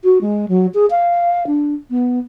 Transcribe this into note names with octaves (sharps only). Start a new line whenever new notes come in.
F#4
G#3
F#3
G#4
F5
D4
B3